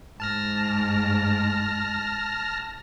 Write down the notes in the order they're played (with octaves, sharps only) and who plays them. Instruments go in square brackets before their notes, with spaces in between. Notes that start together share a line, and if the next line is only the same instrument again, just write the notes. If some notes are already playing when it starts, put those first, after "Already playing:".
[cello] G#2 [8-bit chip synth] A5 F6 A#6